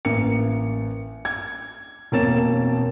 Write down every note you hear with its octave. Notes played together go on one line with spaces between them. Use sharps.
A1 A#3 C#7
G#6
E1 F2 A#3 C#5 A6 E7